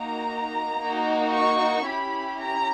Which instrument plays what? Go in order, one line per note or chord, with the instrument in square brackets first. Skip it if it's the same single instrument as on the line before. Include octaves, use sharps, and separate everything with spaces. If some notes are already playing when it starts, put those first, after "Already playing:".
Already playing: [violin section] A#3 D#4 F#4 A#5
A#3 D#4 F#4
C#6
C#4 E4 G4 B5
A#5